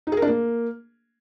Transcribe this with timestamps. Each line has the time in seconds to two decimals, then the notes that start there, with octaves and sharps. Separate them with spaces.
0.07 D#4
0.12 G#4
0.17 A#4
0.22 D4
0.27 A#3